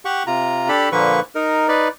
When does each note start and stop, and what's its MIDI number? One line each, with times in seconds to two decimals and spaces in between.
0.05 0.23 67
0.05 0.23 78
0.05 0.23 85
0.27 0.68 48
0.27 0.68 65
0.27 0.68 82
0.68 0.89 62
0.68 0.89 67
0.68 0.89 69
0.68 0.89 83
0.92 1.20 46
0.92 1.20 50
0.92 1.20 53
0.92 1.20 58
0.92 1.20 71
0.92 1.20 85
1.35 1.68 63
1.35 1.68 70
1.68 1.88 63
1.68 1.88 71
1.68 1.88 74